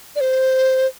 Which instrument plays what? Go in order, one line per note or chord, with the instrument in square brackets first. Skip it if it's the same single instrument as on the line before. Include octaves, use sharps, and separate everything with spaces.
[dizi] D5
C5